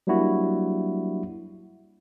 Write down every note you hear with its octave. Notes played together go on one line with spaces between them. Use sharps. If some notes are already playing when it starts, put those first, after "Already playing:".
F#3 G3 A#3 D4 E4 F#4